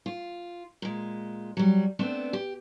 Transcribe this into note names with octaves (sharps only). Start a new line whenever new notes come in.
F4
A#2 G#3
F#3 G3
A3 B3 C4 D4
G4